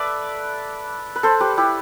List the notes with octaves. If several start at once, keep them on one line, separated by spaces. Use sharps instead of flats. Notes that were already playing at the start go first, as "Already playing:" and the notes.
Already playing: A4 B4 D5 E5
B4
A4 C5
G4 B4
E4 G4